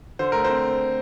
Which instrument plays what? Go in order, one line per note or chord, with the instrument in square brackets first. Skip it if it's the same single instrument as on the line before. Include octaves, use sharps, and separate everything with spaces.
[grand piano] D3 C5
A3 A#4
C5
C4